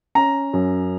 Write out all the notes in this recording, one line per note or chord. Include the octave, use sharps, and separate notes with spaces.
C#4 A#5
F#2